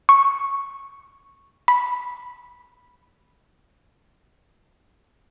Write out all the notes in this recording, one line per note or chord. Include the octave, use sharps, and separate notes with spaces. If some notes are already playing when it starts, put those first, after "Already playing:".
C#6
B5